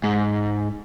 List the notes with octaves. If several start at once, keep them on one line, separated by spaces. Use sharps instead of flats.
G#2